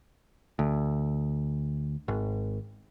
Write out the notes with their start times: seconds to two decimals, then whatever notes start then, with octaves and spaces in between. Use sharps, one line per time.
0.59 D2
2.08 G#1